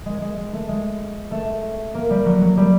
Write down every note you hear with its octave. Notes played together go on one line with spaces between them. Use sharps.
G#3
G#3
G#3
A3
G#3
A3
A#3
G3
F#3
F#3
G3